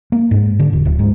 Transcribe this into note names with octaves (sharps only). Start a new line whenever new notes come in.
A#3
G#2
D3
E1
D1
G#2